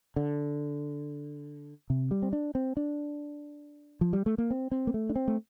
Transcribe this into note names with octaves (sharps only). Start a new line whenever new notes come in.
D3
C3
G3
C4
D4
C4
D4
F3
G3
A3
A#3
C4
C4
A#3
A3
D4
C4
A3